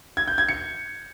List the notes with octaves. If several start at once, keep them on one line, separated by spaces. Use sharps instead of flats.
G#6
G6
G#6
C#7